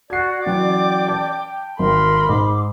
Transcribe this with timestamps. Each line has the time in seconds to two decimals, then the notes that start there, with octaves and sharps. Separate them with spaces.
0.10 F#4 D5 G#6 C7
0.46 E3 F#3 C#4 G5 D6
1.08 A5 G6
1.79 G#1 A#4 B5 C6
2.29 G#2 D6